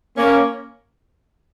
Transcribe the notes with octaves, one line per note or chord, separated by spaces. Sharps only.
A#3 C#4